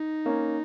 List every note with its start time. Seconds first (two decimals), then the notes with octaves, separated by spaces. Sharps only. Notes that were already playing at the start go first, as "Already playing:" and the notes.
Already playing: D#4
0.25 A#3 C#4